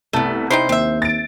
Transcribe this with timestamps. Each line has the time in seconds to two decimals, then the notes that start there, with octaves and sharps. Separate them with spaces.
0.13 C2 A3 B3
0.50 C4 D#4 E4 C5
0.69 D#2 C4 E5
1.02 A6 D7